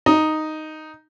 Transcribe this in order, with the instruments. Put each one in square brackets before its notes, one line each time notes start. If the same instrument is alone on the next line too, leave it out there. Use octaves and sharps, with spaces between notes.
[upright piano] D#4